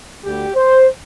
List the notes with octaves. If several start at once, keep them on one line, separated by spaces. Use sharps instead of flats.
D2 D3 G3 G4
C5